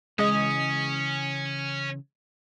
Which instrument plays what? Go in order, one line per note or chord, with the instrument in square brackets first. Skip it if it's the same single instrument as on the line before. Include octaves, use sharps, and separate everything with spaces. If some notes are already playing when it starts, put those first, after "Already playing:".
[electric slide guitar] C#3 E3 [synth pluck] G#3 D#5 [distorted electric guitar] C#4 [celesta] D#6